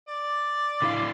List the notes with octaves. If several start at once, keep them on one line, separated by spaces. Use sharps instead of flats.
D5
D3 E4 F5